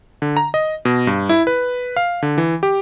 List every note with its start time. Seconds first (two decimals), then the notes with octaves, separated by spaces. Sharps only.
0.22 D3
0.37 A#5
0.54 D#5
0.85 B2
1.07 G2
1.29 E4
1.47 B4
1.96 F5
2.22 D3
2.38 E3
2.63 G4